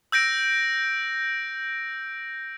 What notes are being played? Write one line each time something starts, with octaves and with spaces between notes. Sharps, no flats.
E6 G6 A#6 D7